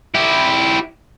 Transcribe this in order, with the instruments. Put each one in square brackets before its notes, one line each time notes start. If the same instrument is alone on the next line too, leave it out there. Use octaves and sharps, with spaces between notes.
[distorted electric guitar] E4 G4